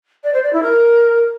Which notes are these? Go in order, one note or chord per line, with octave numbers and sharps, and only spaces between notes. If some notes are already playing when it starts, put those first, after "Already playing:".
D5
C5
D5
E4
A#4